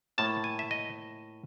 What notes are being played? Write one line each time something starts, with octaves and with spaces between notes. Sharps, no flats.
A2 F3 A#3 A5
G#5
E5
D#5